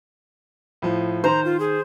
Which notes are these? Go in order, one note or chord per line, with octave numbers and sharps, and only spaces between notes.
A2 F3
D#3 C5 A#5
F4
G#4